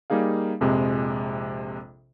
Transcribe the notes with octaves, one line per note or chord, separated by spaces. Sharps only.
G3 A#3 D#4 G#4 F5
A#1 F2 C3 G#3